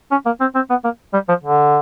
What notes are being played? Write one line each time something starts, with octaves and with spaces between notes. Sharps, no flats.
C#4
A#3
C4
C4
B3
A#3
G3
F3
D3